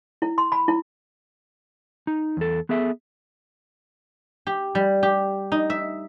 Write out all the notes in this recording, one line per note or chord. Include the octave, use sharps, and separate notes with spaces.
E4
C6
B5
E4
D#4
E2 A4
B3 G#4 A4 E5
G4
G3
G4
D#4
E5